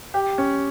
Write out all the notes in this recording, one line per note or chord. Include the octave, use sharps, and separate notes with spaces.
G4
C#4